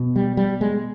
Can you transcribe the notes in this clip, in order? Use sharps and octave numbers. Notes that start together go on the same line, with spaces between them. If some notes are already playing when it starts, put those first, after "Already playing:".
Already playing: B2
G3
G3
G#3